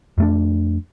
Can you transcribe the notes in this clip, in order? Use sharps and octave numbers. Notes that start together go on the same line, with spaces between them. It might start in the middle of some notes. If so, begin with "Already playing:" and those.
F2 A3 D4